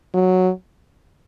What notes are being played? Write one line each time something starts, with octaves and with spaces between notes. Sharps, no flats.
F#3